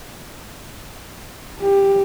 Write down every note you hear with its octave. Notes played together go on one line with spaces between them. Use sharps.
G4